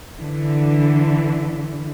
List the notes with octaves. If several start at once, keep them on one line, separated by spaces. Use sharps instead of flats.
D3 E3